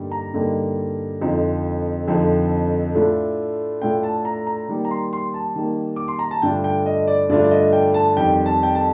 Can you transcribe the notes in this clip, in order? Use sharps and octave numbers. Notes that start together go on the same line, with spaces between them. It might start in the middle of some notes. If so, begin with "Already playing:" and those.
Already playing: G2 D3 G3 A#3 D#4
A#5
G2 D3 G3 A#3 D#4
F2 D3 F3 C4 D#4
F2 D3 F3 C4 D#4
A2 A3 D4 F4
A2 A3 D4 F4 G5
A5
A#5
A#5
D#3 G3 A#3
A#5
C6
C6
A5
D#3 G3 A#3
D6
C6
A#5
A5
G2 D3 A3 D4 F4 G5
G5
D#5
D5
G2 D3 A3 D4 F4 D5
D5
D#5
G5
A5
F2 D#3 G3 C4 G5
A5
G5
A5